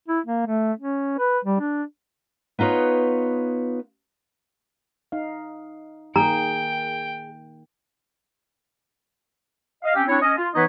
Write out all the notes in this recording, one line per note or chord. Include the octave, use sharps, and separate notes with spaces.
E4
A#3
A3
C#4
B4
G3
D4
B3 D#4 F4 B4 C#5
D#4 F5
D#3 A#3 G#4 G5 A#5
D#5 F5
C4 C#4 G4
C4 D4 E4 C#5
C#4 D#5
F4
E3 B3 D#4 B4 C#5 D#5